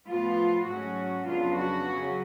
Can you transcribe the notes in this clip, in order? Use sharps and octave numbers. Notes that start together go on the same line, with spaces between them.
A2 F3 B3 F4
G#2 F#3 A3 C#4 F#4
F2 C#3 F#3 B3 D4 F4
F#4
C#3 F#3 C#4